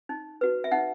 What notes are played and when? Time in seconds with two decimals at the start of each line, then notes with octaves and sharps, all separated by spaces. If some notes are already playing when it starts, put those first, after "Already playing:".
0.09 D#4
0.41 F#4 B4
0.64 E5
0.71 D#4 F#5